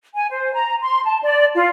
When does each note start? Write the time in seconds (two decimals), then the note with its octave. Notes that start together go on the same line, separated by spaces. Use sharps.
0.15 G#5
0.30 C5
0.54 A#5
0.81 C6
1.04 A5
1.23 D5
1.55 F4